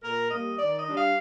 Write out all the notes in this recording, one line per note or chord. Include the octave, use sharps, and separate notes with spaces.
A#2 A#4
G3 A#3 D#5
D#3 D5
D#5
G3 D4
F5